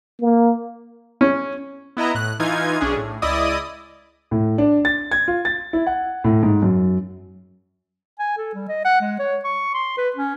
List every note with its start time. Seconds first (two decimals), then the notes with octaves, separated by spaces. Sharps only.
0.21 A#3
1.21 C#4
1.97 B3 E4 D#5 A#5
2.15 A2 F#6
2.40 E3 D#4 F4 G#5 G#6
2.81 B1 C#4 D4 G#4
2.97 A2
3.22 C#2 E4 D5 D#5 D#6
4.31 A2
4.58 D4
4.85 A6
5.12 G#6
5.28 F4
5.45 A6
5.73 E4
5.87 F#5
6.24 A2
6.43 G#2
6.62 F#2
8.19 G#5
8.38 A4
8.54 G3
8.68 D#5
8.84 F#5
9.00 G#3
9.19 C#5
9.44 C#6
9.74 C6
9.97 B4
10.16 C#4